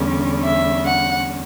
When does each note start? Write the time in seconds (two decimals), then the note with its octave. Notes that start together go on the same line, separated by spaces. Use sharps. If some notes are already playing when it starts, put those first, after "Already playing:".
Already playing: E2 D3 G3 C#4
0.43 E5
0.85 F#5